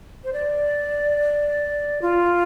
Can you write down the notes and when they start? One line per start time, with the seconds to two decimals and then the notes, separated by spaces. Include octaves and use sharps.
0.24 C5
0.33 D5
2.02 F4